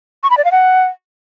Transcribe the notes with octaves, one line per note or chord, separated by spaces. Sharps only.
C#6
B5
D5
F5
F#5